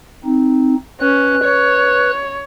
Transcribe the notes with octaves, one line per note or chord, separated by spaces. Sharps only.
C4 D#4
C#4 B4 F#6
C#5